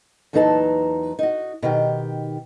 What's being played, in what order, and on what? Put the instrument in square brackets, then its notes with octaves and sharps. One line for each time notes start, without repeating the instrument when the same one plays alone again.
[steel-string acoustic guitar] E2 A#2 F#3 D#4 B4 A5
D#4 F#4
B2 D#3 G4